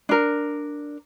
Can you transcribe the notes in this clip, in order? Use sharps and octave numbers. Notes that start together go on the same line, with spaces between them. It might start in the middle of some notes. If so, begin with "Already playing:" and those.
D4 A#4